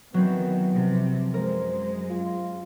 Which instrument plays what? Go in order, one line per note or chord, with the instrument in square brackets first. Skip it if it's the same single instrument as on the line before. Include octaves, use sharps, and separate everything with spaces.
[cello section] D#3 E3 [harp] F#3 C4 [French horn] B3
[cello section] C3 F3
[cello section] F#2 G#3 [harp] A#4 [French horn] C5
[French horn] F4